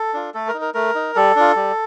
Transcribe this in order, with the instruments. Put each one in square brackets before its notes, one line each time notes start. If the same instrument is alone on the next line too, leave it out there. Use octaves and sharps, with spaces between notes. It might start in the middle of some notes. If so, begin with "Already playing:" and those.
Already playing: [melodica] A4
D4 F4
A3 A4
A#4
D#4
A#4
A3 A#4
D#4
G3 A4
D4 F4
G3